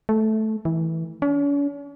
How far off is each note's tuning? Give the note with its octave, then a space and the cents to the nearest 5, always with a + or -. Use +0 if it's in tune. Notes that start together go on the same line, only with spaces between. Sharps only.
A3 -10
E3 -20
C#4 +45